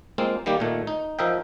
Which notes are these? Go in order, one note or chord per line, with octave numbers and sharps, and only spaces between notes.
G#3 A#3 C4 F4
D#3 G3 A#3 G4
A#2 D#3 A3
D#4
F3 A#4 D#5 E5 G5